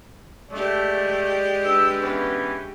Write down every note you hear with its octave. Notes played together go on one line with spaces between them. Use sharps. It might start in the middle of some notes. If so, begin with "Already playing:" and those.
G#3 A3 G4 D5
D4 B4 E6
E3 B3 C#4